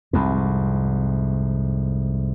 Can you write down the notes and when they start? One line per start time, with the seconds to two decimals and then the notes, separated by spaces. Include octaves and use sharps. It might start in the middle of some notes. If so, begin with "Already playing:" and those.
0.13 C2 F2 G#2